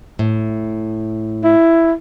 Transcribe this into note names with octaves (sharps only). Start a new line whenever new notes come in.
A2
E4